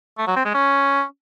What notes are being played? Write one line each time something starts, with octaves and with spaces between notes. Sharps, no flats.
A3
F#3
C4
G#3
C#4